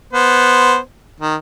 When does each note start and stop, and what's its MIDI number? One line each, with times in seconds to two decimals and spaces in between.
0.13 0.77 59
0.13 0.77 72
1.20 1.35 51